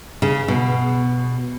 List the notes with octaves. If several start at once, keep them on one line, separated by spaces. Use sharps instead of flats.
C#3
B2